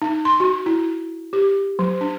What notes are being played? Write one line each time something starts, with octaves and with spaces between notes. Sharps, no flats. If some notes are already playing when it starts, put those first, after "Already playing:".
D#4
C6
F#4
E4
G4
F#3
D4